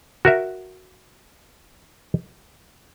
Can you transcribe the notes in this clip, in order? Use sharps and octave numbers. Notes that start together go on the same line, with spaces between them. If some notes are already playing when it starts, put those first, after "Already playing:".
F#4 A#4 E5